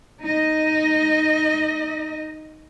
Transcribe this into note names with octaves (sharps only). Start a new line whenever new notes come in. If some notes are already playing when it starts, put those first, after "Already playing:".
D#4 D#5